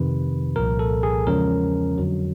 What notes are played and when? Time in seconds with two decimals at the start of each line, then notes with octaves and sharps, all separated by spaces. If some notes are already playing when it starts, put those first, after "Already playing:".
Already playing: F2 C3 D#3 B4
0.56 C2 A#2 F3 A#3 A#4
0.79 A4
1.03 G#4
1.27 E2 C#3 F3 G#3 C#4 A#4
1.98 F2 D3 F#3